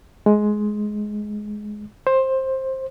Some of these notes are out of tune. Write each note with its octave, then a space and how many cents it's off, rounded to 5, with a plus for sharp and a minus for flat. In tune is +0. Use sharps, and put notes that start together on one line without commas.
G#3 +15
C5 +15